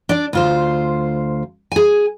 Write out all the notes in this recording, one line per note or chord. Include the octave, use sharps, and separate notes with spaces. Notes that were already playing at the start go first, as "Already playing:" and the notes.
D4 D5
D2 F4 C5
G#4 G#5